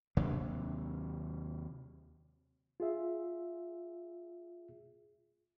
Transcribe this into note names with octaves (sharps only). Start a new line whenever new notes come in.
D#2 C3 F#3 D4
F4 G#4 E5